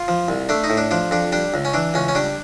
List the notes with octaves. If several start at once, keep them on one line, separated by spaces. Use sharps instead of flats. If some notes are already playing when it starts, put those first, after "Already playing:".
Already playing: F4
F3
C2
A3 D4
D#4
A2
D4
F3 D4
F2 D4
G3 D4
C#2
C#4
E3 D4
C#2 C#4
C#4
G3 D4